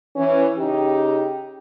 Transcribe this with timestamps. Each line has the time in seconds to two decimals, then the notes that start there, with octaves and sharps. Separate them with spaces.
0.16 E3 C#4
0.57 C#3 D#4 G4